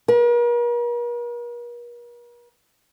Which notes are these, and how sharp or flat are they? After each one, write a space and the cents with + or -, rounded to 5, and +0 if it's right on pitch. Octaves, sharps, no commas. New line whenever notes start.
A#4 +45